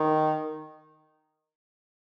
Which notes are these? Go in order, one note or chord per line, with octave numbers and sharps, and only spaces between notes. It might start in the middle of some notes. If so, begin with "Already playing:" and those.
Already playing: D#3